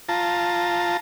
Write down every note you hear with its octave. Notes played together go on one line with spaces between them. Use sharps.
F4 A5 A#5